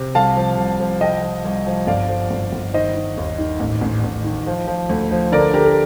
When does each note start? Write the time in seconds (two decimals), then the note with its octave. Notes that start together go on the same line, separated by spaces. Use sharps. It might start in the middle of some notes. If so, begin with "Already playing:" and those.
Already playing: C3
0.15 C2 F5 A5
0.37 F3
0.58 C2
0.80 F3
1.01 C2 D#5 G5
1.22 F3
1.45 C2
1.66 F3
1.87 G1 D5 F5
2.09 F3
2.31 G1
2.52 G1
2.74 D#3 C5 D#5
2.95 D#3
3.17 D#2
3.38 D#3
3.60 A1
3.81 A1
4.04 A1
4.25 D#3
4.47 F3
4.67 F3
4.90 D2
5.11 F3
5.32 D3 A#4 D5
5.54 D3 G4 A#4
5.66 A#4